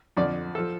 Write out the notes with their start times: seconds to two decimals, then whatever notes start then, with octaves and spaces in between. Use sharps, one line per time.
0.17 F2 D3 F3 D5
0.55 F3 A4